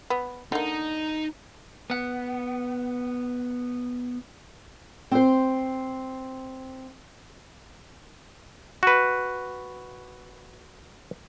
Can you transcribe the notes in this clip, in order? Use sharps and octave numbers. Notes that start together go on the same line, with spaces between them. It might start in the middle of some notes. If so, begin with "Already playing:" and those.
B3
D3 A#3 D#4
B3 F#5
C4 C5
F#4 B4